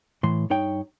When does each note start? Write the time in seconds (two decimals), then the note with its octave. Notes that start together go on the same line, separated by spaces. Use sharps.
0.23 A2 E3 C6
0.50 G2 D#4 C#5 G5